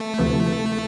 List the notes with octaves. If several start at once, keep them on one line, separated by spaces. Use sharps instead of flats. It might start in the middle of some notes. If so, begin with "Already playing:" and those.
Already playing: A3
D2 C3 F3 B3 E4